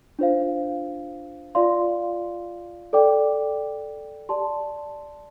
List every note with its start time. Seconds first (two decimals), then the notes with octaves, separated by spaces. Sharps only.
0.19 D4 F4 C5 F5
1.55 F4 D5 F5 C6
2.93 A4 D5 G5 D6
4.29 G4 D5 A5 C6